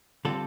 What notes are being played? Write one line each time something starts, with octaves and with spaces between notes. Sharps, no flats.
D3 G3 C4 F4 A4